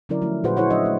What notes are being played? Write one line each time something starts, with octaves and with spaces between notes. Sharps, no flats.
D3 F#3 C#4 E4 A#4 D5
F3 A3 E4
A#2 F#4 G#4 B4 C5 F#5
E4 G#4 C5 C#5 F#5
F#3 C#4 D4 D#5 E5
A3